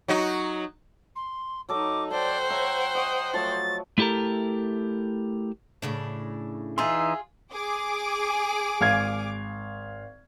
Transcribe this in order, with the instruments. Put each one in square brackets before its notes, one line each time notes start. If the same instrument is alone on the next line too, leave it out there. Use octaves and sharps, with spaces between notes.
[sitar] F#3 D#4 F#4
[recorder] C6
[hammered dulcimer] F#3 A4 D#5 [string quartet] D#4 [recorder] D6
[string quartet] C5 F#5 G5 [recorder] D5 [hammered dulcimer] A5
[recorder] C#5 [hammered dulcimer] E5 A#5 B5
[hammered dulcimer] D#5 C#6 [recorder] D#6
[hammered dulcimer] F3 F#3 A3 [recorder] A6
[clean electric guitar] A3 E4 G4 A4 A#4
[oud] A2 C#3 D4
[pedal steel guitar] E3 D#4 C6 [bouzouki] F4 G#4 [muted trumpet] E5
[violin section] G#4 D6
[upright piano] G#1 F5 G#6